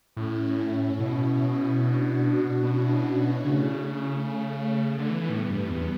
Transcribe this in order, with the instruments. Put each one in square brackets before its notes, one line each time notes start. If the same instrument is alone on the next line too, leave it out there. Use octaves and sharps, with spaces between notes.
[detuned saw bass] A2 [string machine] C#4 E4
[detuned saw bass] B2
[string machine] D4 F#4
[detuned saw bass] B2 [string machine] C#4 E4
[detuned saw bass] C#3 [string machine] A3
[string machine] A3
[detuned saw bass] D3
[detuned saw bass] E3 [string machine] G3 B3
[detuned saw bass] A2
G2
E2